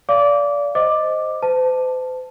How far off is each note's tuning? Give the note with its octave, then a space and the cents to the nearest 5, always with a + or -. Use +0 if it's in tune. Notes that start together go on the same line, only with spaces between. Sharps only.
D5 -25 F5 -15 D6 -20
C5 +0 D#5 +0 D6 +10
C5 -45 A5 +0